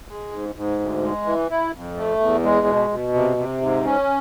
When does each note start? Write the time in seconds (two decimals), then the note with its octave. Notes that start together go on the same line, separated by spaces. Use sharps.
0.08 G#3
0.32 G#2
0.55 G#2
0.79 D2
1.02 G#3
1.26 E3
1.50 E4
1.73 F2
1.96 A3
2.20 E2
2.43 G#3
2.66 B2
2.90 B2
3.14 C3
3.37 C3
3.61 G#2
3.85 C#4